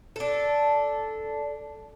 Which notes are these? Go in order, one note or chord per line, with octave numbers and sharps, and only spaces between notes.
D4 A4